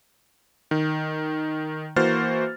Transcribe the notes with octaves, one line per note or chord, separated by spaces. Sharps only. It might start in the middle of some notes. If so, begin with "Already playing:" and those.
D#3
E3 A#3 F#4 C5 F6 A6